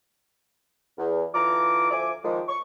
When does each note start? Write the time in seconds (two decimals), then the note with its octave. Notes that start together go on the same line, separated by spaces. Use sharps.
0.98 E2
1.34 D3 E3 F4 A#5 D6
1.91 D2 F3 E5 G#5 D6
2.24 D#3 F3 G#3
2.48 C#6